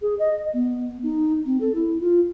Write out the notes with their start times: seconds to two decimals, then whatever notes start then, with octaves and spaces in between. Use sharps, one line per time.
0.01 G#4
0.19 D#5
0.53 B3
1.03 D#4
1.46 C4
1.60 A4
1.74 E4
2.00 F4